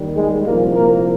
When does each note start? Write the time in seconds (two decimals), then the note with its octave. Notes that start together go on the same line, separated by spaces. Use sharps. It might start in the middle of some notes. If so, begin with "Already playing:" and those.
Already playing: D#2 D#3 G3
0.15 G#3 G#4
0.45 C2 A#2 F3 A#3 A#4
0.75 A#3 A#4